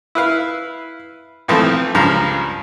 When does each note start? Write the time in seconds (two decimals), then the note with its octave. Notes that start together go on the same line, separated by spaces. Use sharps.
0.15 E4 B4 F5
1.48 B1 E3 F3 A3 C4
1.95 C#2 G2 F3 A#5